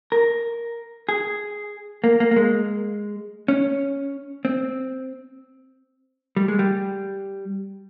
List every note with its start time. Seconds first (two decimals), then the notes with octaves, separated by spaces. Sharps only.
0.12 A#4
1.09 G#4
2.04 A#3
2.20 A#3
2.31 A#3
2.36 G#3
3.48 C#4
4.45 C4
6.37 G3
6.48 G#3
6.59 G3